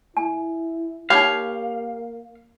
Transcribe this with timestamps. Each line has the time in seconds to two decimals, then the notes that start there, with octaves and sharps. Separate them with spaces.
0.17 E4 G#5
1.10 A#3 D#4 G4 C#5 F5 G5 B5